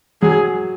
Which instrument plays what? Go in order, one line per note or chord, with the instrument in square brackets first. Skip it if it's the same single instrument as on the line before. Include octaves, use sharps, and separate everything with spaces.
[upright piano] F#3 [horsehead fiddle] G#4